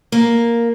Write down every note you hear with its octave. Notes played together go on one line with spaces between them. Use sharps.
A#3